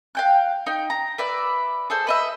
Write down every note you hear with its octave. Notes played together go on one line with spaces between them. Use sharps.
F5 G5 F#6
D#4 G5
A#5
B4 D5 E5
G#4 A4 C5
B4 D#5 E5